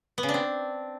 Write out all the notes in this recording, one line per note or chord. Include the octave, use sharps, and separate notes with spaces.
B3
C#3
D4
C4